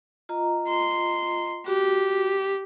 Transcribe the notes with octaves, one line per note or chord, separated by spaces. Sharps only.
F4 D#5 A#5
C6
F#4 G4